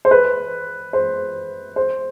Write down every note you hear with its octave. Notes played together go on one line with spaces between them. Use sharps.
C5
B4
C5
C5